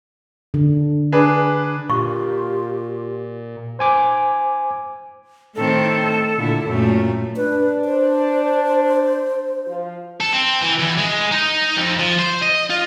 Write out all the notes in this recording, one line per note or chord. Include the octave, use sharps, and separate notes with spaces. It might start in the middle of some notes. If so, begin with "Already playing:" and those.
D3
D4 G#4 B4
A#2 F4 G4 C#6
C5 G#5 D6
A2 D#3 C4 A4
A#2 D3 E4
F#2 A#2 A3
D4 B4
C5
F3 F4
A4
C4
E3
E2
G#3
D#4
F2
F3
C5
D#5
F4